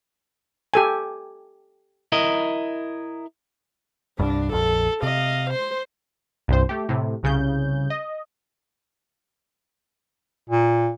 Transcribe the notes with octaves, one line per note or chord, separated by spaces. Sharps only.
G4 A4 G#5
E4 A#4 D#5
C2 G2 D4
A#1 F2 A4
C3 D#5 F5
C5 C6
C2 G2 C5
A3 G4
A2 C3
C2 C#3 G6
D#5
A#2